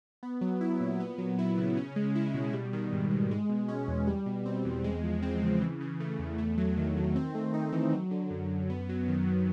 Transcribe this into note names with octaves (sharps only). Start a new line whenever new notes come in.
B3
F#3
E4
A#2
B3
F#3
E4
C#3
C#4
G#3
E4
B2
G3
D#3
G#2
G#2
G#3
B2
C#4
E2
G3
B2
C4
E2
G#3
F3
C4
C#3
E3
C#3
A3
E2
A3
F#3
D#3
D#3
C4
A3
D#4
E3
F#3
D3
F#2
F#2
B3
F#3
D#3
D#3